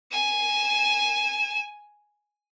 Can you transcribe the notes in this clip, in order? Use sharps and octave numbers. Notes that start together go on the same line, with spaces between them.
G#5 E7